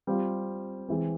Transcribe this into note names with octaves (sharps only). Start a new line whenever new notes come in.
G3 C4 F4
E3 G#3 C4